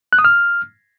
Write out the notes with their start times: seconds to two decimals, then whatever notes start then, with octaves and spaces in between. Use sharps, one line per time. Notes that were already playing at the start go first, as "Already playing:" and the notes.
0.13 F#6
0.19 D#6
0.25 F6